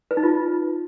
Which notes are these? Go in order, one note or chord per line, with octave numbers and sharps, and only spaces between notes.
B4
D#4
F4